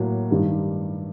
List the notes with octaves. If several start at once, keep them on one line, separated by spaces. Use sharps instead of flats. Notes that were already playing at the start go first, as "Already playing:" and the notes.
Already playing: A2 F#3 A#3
G2 D#3 G3